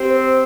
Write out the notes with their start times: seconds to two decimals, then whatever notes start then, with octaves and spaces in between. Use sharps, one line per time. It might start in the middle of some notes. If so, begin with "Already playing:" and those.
Already playing: C4 G4
0.10 C5